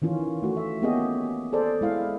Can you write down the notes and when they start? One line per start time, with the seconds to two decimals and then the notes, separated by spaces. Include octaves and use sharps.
0.02 D#3 E3 C#4 F4
0.42 A3 F#4
0.57 E5
0.82 A#3 B3 C#4 G4 G#4 D#5
1.53 G#4 A4 C5 D5
1.81 G#3 E4 F5